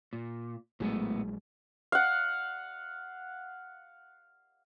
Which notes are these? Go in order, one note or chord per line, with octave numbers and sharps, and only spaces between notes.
A#2
A#1 A2 F#3 G#3 A3 B3
F5 F#5